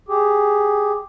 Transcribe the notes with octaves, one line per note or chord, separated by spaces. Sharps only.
G4 G#4